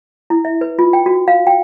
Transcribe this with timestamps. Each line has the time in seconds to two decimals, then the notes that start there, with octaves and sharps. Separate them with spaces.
0.30 E4
0.45 E5
0.61 B4
0.79 F4
0.93 G5
1.06 F#4
1.28 F5
1.47 G5